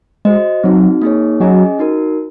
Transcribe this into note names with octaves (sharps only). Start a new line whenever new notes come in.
G#3 F#4 C5 D#5
F#3 C4 D#4 F#4
A#3 D#4 G#4 C#5
F#3 C#4 G#4 D#5 G#5
D#4 F#4 A#4